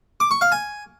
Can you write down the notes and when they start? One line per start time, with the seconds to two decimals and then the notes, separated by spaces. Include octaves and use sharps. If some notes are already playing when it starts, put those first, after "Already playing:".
0.20 D6
0.31 C#6
0.41 F5
0.52 G#5